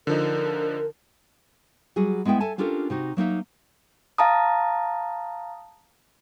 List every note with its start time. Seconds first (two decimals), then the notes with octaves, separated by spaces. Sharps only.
0.07 D3 F3 D#4 A#4
1.96 F#3 G3 F#4 G#4
2.25 G#3 B3 E4 E5 G5
2.40 A4 E5 G#5 A5
2.58 C#4 D4 F4 G4 A4 A#4
2.90 C3 D#4 F#4
3.17 F#3 A#3 D#4 E5
4.18 F5 A5 A#5 D#6